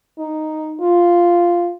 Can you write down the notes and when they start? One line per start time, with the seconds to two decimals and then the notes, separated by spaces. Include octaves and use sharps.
0.19 D#4
0.81 F4